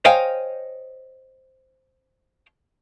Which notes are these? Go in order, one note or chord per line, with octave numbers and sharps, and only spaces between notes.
C5 C#5 D#5 F5 G5 G#5